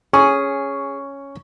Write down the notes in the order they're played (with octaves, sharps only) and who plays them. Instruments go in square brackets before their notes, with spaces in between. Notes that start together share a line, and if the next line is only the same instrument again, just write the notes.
[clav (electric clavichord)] C#4 [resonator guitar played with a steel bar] G#4 [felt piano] C#6